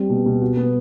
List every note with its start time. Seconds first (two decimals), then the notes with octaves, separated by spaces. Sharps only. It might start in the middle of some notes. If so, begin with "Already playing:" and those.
Already playing: G3 C4
0.10 B2
0.26 B2
0.41 F#4
0.57 B3